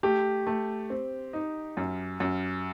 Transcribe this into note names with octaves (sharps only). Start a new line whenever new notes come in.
A3 G4
A3
C4
D#4
F#2
F#2